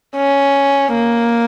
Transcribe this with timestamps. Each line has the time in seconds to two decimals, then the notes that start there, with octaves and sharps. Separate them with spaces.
0.16 C#4
0.94 A#3